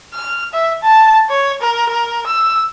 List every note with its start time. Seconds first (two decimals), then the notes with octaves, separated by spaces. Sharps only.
0.14 F6
0.54 E5
0.83 A5
1.30 C#5
1.61 A#4
1.90 A#4
2.27 E6